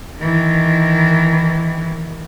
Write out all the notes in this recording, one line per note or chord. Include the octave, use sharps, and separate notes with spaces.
D#3 E3